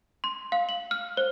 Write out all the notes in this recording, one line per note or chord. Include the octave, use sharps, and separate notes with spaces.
C6
F5
F#7
F6
C5